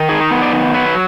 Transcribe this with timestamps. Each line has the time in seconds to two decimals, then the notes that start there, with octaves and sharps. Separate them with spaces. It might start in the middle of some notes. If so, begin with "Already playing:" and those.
Already playing: D#3
0.09 D#4 G#4
0.31 B3
0.42 D5
0.52 D#3
0.74 F#3 B4